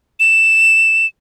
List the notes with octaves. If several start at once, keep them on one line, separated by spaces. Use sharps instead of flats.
E7